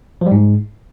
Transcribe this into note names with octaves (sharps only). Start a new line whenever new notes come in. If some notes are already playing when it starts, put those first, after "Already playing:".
F3
G3
G#2